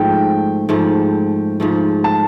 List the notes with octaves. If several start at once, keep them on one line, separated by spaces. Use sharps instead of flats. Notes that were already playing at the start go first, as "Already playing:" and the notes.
Already playing: G#2 F3 A3 G5
G#2 F3 A3
G#2 F3 A3
A5